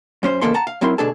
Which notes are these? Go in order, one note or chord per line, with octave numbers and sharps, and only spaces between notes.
F#2 C#4 C5
E2 G#2 C#3 A#3 A4 C6
F#5 A5 A#5
F5
G#2 F#3 C4 E4 A#4 C6
D2 B2 D4 G#4 A4 A5